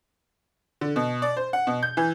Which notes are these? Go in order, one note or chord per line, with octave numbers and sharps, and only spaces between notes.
D3
B2
D5
C5
F#5
B2
G6
E3